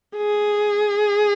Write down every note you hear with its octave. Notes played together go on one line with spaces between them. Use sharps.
G#4